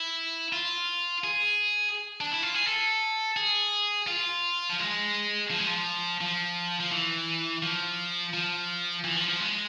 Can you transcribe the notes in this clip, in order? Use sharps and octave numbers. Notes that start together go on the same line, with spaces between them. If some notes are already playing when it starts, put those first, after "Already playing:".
Already playing: E4
F4
G#4
D4
E4
F4
G#4
A4
G#4
F4
F3
G#3
F3
G#3
F3
F3
F3
E3
F3
F3
E3
F3
F3
G#3